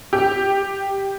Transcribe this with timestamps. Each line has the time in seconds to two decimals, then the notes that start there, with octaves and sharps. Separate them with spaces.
0.13 G4